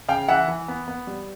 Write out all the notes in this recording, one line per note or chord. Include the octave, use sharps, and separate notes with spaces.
C#3 F5 G5
E3 E5 F#5
E3
B3
B3
G3